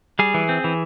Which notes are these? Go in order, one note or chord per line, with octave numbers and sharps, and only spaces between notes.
G3 G#4
E3
C4
E3